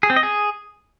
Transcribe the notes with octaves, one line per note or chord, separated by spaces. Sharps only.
G#4
C4
D#5
G#4